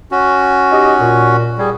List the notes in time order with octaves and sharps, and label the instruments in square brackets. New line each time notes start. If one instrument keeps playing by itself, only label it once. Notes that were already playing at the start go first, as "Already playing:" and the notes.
[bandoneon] C#4 F#4
[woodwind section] D#4 G4 D#5
A#2
[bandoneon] G3 [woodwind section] G#4